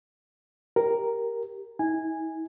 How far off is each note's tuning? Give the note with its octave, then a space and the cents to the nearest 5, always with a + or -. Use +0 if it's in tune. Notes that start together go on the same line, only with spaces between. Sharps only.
G4 +0 A#4 +0
E4 -45 G#5 -10